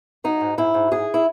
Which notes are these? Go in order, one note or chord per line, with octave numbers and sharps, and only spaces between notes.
F#3 D#4
G#2
G#2 E4
G#2
G#2 G#4
E4